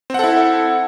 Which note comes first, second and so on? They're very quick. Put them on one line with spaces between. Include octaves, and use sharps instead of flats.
C4 F#5 A4 E4